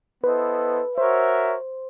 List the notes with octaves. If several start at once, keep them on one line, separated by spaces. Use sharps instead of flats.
B3 E4 A4 B4 C5 D#5
F#4 A#4 C5 C#5 E5